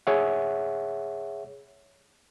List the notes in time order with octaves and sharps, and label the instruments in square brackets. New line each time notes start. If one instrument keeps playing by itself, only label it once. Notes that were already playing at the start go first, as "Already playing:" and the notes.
[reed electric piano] G#4 C#5 E5 F#5